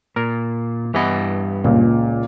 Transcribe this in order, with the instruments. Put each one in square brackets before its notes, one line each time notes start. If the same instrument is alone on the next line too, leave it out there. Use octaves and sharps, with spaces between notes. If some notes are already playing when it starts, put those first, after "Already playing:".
[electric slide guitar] A#2 [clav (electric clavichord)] A#4
[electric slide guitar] G2 G4 D#5 [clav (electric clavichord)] E3 B3
[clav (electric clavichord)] C#2 [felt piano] A#2